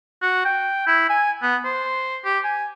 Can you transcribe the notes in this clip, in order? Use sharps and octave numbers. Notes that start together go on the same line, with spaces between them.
F#4
G5
E4
G#5
B3
C5
G4
G#5